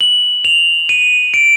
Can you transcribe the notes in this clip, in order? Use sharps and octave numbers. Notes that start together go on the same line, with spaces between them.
F#7
F7
D#7
D7